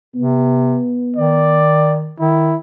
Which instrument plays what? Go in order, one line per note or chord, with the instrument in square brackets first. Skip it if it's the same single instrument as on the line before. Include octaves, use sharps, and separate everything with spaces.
[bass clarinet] C3 [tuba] B3
[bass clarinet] D#3 [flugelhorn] D5
[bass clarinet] D#3 [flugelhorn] E4